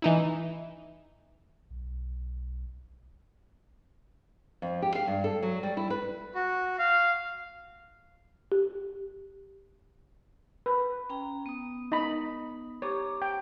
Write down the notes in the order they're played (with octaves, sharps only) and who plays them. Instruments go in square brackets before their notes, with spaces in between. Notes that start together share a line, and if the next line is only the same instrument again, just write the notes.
[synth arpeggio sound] E3 D#4 E4
[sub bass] B1
[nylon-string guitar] F2
G4
F5
G2
A4
F#3
G3
E4
B4
[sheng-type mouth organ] F#4
F5
[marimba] G4
[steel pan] B4
[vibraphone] C#4 G5 A#5
B3 D#6
[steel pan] D#4 B5
[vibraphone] G4 A#5 D6 [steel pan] C#5
[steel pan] G5